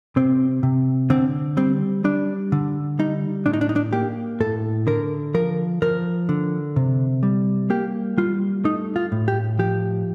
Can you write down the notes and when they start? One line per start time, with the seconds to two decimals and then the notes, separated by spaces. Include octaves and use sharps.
0.16 C3 C4
0.63 C3
1.10 D3 C4
1.57 G3 C4
2.04 G3 D4
2.52 D3
2.99 G3 D#4
3.46 A2 D4
3.53 D#4
3.61 D4
3.69 D#4
3.76 D4
3.93 A#3 G4
4.40 A2 A4
4.87 D3 A#4
5.34 F3 A#4
5.82 F3 A#4
6.29 D3
6.76 C3
7.23 G3
7.70 A#3 G4
8.18 G3 F4
8.64 A3 D#4
8.96 F4
9.12 A2
9.28 G4
9.59 F3 G4